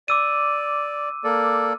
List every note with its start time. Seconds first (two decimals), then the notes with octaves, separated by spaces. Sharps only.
0.08 D5 D6 E6 D#7
1.24 A#3 A4 D5